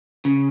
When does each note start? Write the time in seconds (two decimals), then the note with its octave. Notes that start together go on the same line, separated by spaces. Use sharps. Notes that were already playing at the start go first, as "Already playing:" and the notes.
0.25 C#3